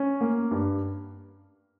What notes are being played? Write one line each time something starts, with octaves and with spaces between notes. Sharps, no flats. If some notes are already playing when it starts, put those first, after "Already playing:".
Already playing: C#4
A#3
G2